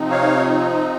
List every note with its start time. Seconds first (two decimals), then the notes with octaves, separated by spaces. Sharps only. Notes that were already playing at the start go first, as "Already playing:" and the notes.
Already playing: C3 F3 C4 D#4
0.11 C#5 F5